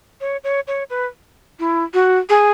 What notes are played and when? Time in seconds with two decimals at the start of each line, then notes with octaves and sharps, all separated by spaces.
0.21 C#5
0.44 C#5
0.67 C#5
0.90 B4
1.60 E4
1.94 F#4
2.29 G#4